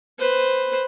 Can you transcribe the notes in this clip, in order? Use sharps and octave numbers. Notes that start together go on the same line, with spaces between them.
B4 C5